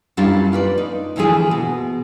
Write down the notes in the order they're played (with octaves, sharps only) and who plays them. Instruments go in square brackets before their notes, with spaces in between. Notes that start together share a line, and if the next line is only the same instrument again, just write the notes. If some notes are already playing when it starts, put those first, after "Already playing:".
[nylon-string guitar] F#2 G3 C#4 D4 E4 F4
F4 B4 D5
D#4
D2 E3 F3 E4 G#4
B2